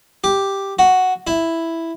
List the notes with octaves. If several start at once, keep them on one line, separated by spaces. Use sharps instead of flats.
G4
F#4
E4